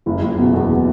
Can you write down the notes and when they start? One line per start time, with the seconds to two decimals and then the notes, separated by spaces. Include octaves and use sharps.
0.06 F#1
0.22 F#1
0.38 B2
0.54 E2